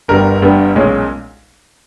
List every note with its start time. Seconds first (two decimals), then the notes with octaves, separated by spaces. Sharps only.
0.08 G1 G2 G3 B3 A#4
0.42 G1 G2 G3 B3
0.75 B1 A#2 G#3 C#4